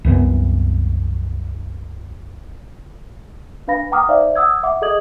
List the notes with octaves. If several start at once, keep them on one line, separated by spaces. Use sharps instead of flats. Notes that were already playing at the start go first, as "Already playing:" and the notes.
C2 F#2 E3 B3
D4 B4 F5 B5 A#6
F#5 G5 A#5 D6 D#6 F6
D#4 C5 D5 E5 F5
F#5 D#6 E6 G#6
E5 F#5 D6
G#4 A4 D#5 D#6 G#6 F#7